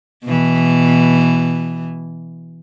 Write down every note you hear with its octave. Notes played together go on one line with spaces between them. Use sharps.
B2 E3